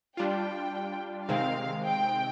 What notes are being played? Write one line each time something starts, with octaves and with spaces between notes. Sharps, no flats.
G3 D4 F4 G5
C3 D#3 G#3 C4 F5
G5